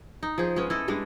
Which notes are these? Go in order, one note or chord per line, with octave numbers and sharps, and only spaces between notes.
D#4
F3 G#4
G#3 B3 C#4
E4 A4 D#5
G3 G#3 D4